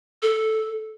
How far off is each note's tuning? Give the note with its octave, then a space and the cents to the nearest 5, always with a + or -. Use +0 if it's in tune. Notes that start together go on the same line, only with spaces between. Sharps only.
A4 -5